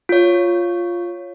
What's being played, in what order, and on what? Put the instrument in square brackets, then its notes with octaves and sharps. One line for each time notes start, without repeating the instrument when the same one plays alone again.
[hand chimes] F4 C#5